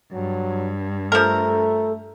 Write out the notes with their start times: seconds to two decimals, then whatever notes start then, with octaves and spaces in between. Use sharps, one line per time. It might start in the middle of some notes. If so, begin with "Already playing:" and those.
0.13 G2 F#3
1.12 F3 A3 A4 A#4